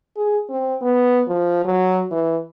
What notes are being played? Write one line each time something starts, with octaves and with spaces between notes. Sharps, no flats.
G#4
C4
B3
F3
F#3
E3